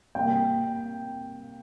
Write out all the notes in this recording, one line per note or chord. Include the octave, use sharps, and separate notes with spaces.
C3 G3 A#3 G5